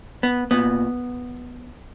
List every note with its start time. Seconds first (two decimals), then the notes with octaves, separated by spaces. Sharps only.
0.23 B3
0.51 A#2 B3